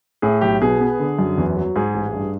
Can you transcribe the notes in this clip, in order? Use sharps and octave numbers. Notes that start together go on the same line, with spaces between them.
A2 G#4
B1 G4
B2 G#4
B3
D3
F#2
E2
F#3
G#2 G#4
A1
G2